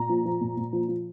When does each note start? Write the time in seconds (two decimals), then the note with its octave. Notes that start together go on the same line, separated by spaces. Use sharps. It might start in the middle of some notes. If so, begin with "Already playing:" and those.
Already playing: A#2 A#5
0.09 F3
0.25 F3
0.41 A#2
0.57 A#2
0.73 F3
0.88 F3